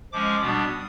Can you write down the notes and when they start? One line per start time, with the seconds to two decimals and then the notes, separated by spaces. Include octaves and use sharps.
0.13 F3 G#3 C#4 D6
0.41 B2 G3 B3 D4 D#6